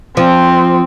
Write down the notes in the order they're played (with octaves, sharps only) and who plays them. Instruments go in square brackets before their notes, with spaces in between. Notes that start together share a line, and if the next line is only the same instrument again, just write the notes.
[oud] F3 [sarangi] C4